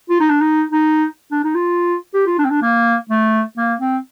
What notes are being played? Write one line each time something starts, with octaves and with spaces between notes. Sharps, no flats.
F4
D#4
D4
D#4
D#4
D4
D#4
F4
G4
F4
D4
C4
D4
A#3
A3
A#3
C4